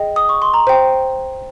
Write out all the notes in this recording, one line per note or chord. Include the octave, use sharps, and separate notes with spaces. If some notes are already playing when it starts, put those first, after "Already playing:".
Already playing: G#4 D#5 G5
D#6
C#6
C6
A#5
C5 G5